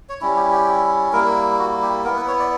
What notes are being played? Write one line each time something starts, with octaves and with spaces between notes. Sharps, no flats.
C#5
G3 C#4 E4
G4
G4
G3 A#3 E4 A#4
F#4
G4
B3 E4 A#4
B4
C#5
D5